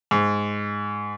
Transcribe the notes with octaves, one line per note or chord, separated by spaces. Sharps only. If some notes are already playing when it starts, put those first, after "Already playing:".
G#2